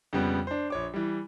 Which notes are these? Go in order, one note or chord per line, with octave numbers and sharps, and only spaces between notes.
F2 C#3 G3 B3
D4 C5
A#1 C#5 D6
E3 G3